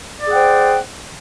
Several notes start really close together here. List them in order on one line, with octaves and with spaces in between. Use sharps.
D5 G#4 F#5 G5 C5